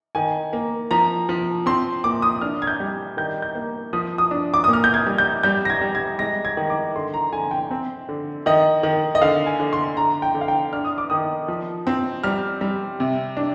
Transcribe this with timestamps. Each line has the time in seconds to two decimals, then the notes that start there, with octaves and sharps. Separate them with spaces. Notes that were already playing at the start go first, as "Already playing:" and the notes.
0.15 D#3 G#5
0.53 A#3
0.91 F3 A#5
1.29 F3
1.66 C4 C6
2.04 A#2 D6
2.22 D#6
2.41 D4 F6
2.62 G#6
2.67 G6
2.80 G3
3.17 D#3 G6
3.42 G6
3.55 A#3
3.93 F3 D#6
4.18 D#6
4.31 D4
4.54 D6
4.64 A#2 D#6
4.73 F6
4.84 G6
4.94 G#6
5.06 G3
5.18 G6
5.43 G3 G6
5.65 A#6
5.70 G#6
5.81 G3
5.95 G#6
6.19 G#3 A#6
6.45 G#6
6.57 D#3
6.70 D6
6.96 D3 C6
7.14 A#5
7.33 D3 G#5
7.51 G5
7.71 C4
8.09 D3
8.46 D#3 D#5
8.83 D#3
9.15 D#5
9.22 D3 F5
9.46 G#5
9.60 D3
9.73 C6
9.97 D3 A#5
10.22 G5
10.34 D3
10.41 F5
10.48 G5
10.73 D4 F6
10.85 D#6
10.98 D6
11.10 D#3 D#6
11.48 F3
11.87 C4
12.24 G3 F6
12.61 G3
13.00 C3
13.37 D4